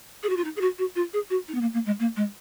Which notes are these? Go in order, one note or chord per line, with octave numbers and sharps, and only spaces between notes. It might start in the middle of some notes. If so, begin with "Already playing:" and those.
G#4
F#4
F4
D#4
G#4
F#4
F#4
F4
G#4
F#4
D#4
B3
A#3
A#3
G#3
A#3
G#3